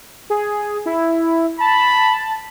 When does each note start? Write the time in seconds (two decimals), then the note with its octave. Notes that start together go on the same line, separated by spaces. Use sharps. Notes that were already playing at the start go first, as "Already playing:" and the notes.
0.30 G#4
0.86 E4
1.60 A5 B5